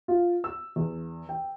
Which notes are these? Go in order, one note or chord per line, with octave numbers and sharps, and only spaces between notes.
F4
E6
E2
G5